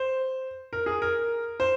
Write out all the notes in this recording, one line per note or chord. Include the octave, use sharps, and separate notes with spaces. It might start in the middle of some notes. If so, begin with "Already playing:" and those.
Already playing: C5
A#4
G#4
A#4
C5